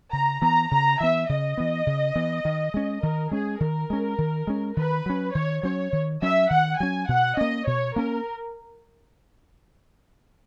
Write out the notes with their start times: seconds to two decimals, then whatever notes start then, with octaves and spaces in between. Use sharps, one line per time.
0.13 C#3 A#5
0.42 E3 B3 A#5
0.71 C#3 A#5
1.00 E3 B3 E5
1.29 C#3 D#5
1.57 E3 B3
1.87 C#3
2.16 E3 B3
2.45 D#3
2.74 G#3 C#4
3.02 D#3 A#4
3.31 G#3 C#4 G#4
3.60 D#3 A#4
3.90 G#3 C#4
4.18 D#3
4.47 G#3 C#4
4.77 D#3 B4
5.06 F#3 C#4
5.35 D#3 C#5
5.63 F#3 C#4 C#5
5.93 D#3
6.22 F#3 C#4 E5
6.50 D#3 F#5
6.80 F#3 C#4 G#5
7.08 B2 F#5
7.37 A#3 C#4 D#5
7.67 B2 C#5
7.96 A#3 C#4 A#4